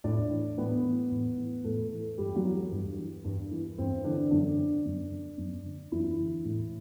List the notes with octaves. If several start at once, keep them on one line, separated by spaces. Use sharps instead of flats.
A2 D4 D5
E3
A2 B3 B4
E3
A2
E3
A2 A3 A4
E3
G2 G3 G4
F#3 F#4
E3
G2
E3
G2
E3
G2 C4
D3 E3 D4
F#2 D3 D4
D3
F#2
D3
F#2
D3
F#2 E3 E4
D3
A2